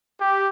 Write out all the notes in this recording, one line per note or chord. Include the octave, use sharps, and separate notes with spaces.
G4